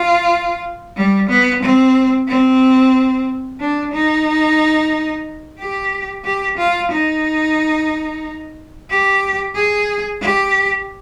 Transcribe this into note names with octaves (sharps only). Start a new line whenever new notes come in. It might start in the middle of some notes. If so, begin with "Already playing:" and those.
Already playing: F4
G3
B3
C4
C4
D4
D#4
G4
G4
F4
D#4
G4
G#4
G4